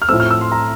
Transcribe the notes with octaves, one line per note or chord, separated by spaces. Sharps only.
F6
A2 F3 A3 C4 E6
F6
E6
C6
A#5